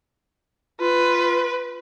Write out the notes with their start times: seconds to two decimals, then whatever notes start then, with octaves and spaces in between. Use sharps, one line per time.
0.81 F4 B4